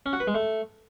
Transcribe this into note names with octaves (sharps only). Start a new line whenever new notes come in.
C#4
F#4
B4
G#3
A3